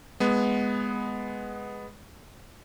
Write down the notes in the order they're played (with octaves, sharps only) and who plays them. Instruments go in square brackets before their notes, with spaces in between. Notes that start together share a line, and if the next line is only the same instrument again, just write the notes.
[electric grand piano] G#3 B3